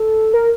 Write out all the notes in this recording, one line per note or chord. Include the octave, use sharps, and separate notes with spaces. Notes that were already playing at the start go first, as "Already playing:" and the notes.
Already playing: A4
A#4